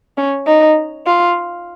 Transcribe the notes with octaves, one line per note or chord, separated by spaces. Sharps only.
C#4
D#4
F4